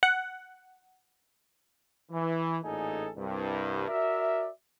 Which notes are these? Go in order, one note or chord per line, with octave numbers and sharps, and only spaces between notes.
F#5
E3
A1 A#2 D#4 G#4 A4 G#5
C2 G2
F#4 A#4 D5 E5